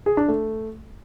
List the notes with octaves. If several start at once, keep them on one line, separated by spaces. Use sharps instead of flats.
G#4
D4
A3